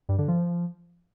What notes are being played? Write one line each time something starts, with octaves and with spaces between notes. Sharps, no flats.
G2
D3
F3